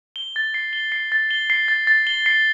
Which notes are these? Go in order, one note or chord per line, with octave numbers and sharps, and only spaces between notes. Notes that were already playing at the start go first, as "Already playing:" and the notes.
G7
A6
C7
G7
C7
A6
G7
C7
A6
A6
G7
C7